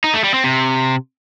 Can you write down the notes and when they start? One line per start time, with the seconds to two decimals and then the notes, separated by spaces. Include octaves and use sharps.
0.04 D#4
0.14 A3
0.24 G3
0.34 C4
0.44 C3